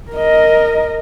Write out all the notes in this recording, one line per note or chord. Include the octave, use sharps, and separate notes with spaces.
A#4 D#5